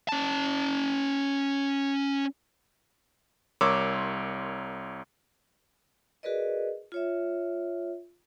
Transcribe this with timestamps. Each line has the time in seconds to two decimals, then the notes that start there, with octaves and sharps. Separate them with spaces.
0.09 C#4 A5
3.61 C2 A#4 C#5 C6 D6 E6
6.23 F#4 G#4 A#4 B4 D5 D#5
6.92 F4 C#5 E5